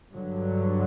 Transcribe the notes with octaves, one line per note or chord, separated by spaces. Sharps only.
G2 D3 F#3